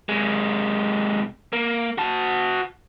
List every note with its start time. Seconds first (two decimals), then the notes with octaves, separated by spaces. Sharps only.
0.09 C3 G#3
1.53 A#3
1.98 F#4 A5